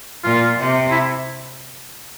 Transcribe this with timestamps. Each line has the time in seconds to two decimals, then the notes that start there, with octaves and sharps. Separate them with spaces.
0.24 A#2 F4
0.58 C3
0.91 E4